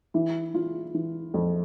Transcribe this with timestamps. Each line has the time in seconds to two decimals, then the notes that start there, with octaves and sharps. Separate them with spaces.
0.14 E3 E4
0.54 E3 F4
0.94 E3
1.34 F2